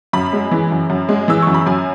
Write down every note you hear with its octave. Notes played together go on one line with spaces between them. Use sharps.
F#2 B5
G#3
E3
F#2
F#2
G#3
E3 E6
F#2 C#6
B5
F#2 G#5